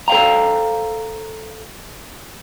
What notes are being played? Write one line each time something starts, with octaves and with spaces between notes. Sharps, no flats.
A4 C5 E5 F5 G5 A#5